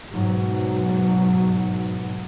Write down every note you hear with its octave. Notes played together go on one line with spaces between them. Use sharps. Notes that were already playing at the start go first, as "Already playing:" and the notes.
G#2 B2 F#3